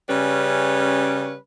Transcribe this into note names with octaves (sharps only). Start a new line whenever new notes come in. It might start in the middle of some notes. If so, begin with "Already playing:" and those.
C#3 G3 C#4 B4